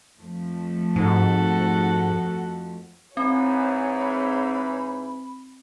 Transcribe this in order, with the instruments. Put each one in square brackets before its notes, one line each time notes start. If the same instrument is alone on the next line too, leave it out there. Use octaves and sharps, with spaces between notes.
[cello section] F2 F3 A3
[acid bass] G#2 [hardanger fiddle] F#4 A4
[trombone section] G#2 E3 [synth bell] C4 [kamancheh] C5 C#5 [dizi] B5